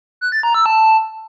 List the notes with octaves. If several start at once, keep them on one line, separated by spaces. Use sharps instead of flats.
F#6
A6
A#5
E6
A5